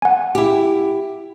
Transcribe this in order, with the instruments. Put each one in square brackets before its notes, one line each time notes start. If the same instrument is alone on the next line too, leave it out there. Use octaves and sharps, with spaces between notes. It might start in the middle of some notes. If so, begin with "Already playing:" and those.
[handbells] F#5 G#5
[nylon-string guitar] E4 G4